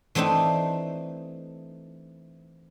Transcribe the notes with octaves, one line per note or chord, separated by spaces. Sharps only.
E3 A3 C4 D4 D#4